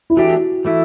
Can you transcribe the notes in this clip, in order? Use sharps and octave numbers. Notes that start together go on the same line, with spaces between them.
E4
E3 A3 D4 F#4 G4
E3 A3 E4